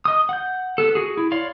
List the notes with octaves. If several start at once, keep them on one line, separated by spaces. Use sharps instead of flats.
D#5 D#6
F#5 G6
B3 A4
F#4 G#4
E4
C#5 D5 F5 C6